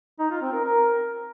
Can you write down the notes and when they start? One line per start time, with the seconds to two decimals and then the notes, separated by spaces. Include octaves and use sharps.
0.19 D#4
0.30 F4
0.42 C4
0.53 A#4
0.64 A#4